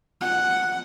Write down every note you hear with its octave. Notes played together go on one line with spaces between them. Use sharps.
F#5